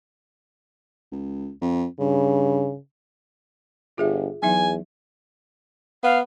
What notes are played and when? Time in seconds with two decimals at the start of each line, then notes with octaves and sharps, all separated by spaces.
1.11 C#2
1.61 F2
1.99 G2 C#3
3.98 G1 F4 G#4 E5
4.43 E2 F#3 D#4 E5 G#5
6.04 B3 F5